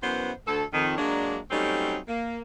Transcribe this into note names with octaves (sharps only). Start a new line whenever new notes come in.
F#2 E3 B3 C5
D2 A4
F2 D#3
F#3 G#3 A#3 D4
F#3 G3 A3 C4 C#4 D#4
A#3